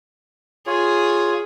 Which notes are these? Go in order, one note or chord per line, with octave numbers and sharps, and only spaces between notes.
F4 G#4 C#5